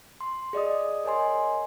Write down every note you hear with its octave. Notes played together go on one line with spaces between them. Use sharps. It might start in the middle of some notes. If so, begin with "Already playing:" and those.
C6
G#4 D5 D#5 D#6
A#4 C#5 D#5 G#5 C6